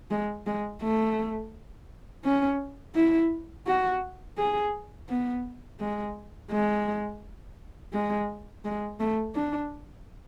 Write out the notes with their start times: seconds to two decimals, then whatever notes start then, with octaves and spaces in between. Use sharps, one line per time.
0.11 G#3
0.47 G#3
0.82 A3
2.25 C#4
2.95 E4
3.67 F#4
4.37 G#4
5.09 B3
5.80 G#3
6.51 G#3
7.93 G#3
8.65 G#3
9.00 A3
9.35 D4